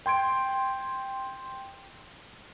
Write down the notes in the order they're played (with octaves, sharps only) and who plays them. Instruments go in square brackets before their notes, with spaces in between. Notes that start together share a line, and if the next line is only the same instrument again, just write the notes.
[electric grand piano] G5 C6 G#6 D7